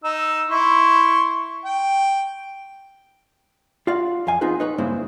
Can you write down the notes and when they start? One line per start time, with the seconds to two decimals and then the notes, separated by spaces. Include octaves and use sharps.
0.04 D#4 E6
0.49 E4 C6 C#6
1.65 G5
3.87 F4 F#4 D5 F5
4.27 F2 F5 G#5
4.41 B3 C4 D#4 F4 G#4 B4
4.60 D#4 B4 C#5
4.78 G2 C#3 G#3 A#3 C4 E4